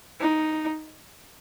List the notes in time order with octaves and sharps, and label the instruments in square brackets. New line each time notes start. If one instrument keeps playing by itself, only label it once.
[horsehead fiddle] D#4